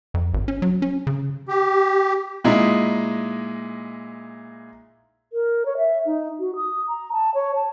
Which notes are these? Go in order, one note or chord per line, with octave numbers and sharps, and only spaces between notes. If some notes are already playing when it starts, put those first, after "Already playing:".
F2
G#1
C#4
F#3
C#4
C#3
G4
A#2 G#3 D#4 E4
A#4
C#5
E5
D#4
F#4
D#6
A#5
A5
C#5
A5